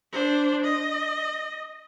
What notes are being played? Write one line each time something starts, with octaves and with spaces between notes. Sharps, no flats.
D4 C5
D#5